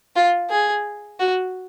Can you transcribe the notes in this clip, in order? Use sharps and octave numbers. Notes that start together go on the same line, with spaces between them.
F4
G#4
F#4